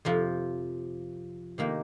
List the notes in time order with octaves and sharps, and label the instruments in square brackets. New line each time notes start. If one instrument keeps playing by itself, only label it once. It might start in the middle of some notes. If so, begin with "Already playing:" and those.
[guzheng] F2 C3 F3
C3 D#3 A#3